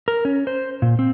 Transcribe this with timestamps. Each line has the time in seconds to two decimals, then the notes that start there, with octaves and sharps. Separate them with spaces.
0.08 A#4
0.25 C#4
0.47 C5
0.82 A#2
0.99 C4